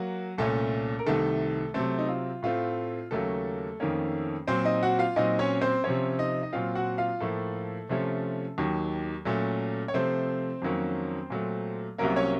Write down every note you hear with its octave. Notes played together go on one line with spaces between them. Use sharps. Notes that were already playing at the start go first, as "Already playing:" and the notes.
Already playing: F#3 A#3 F#4
C2 A#2 A3 C#4 A4
A#4
C2 C3 D#3 A3 A4
C3 F#3 A3 C4 A4
D#4
F4
A2 A3 C4 F4
D#2 C#3 F#3 A3 A#3 C#4 A4
F2 D#3 A#3 C#4
A#2 F#3 C4 C5
D#4 D#5
F#4 F#5
F4 F5
A#2 F#3 C4 D#4 D#5
C#4 C#5
C4 C5
C3 F3 C4 C#4 C#5
D#4 D#5
D#5
A#2 F#3 C4 F4 F5
F#4 F#5
F4 F5
A2 F3 A3 A#3 A4
C3 F3 A3 C#4
D#2 D#3 F#3
A#2 F#3 A3 C#4
C#5
C3 F3 A3 C4 C5
F2 D#3 F#3 A#3 C#4
A#2 F#3 A3
C2 C3 F#3 A#3 C#4 A#4
C#4 C#5